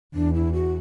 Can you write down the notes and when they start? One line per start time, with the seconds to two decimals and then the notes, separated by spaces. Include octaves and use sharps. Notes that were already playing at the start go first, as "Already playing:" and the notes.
0.14 E2 D4
0.34 E4
0.53 F#4